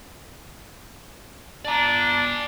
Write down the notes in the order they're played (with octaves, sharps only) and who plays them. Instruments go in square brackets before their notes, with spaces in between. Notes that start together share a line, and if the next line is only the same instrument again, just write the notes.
[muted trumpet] D4 [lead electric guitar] D5 A#5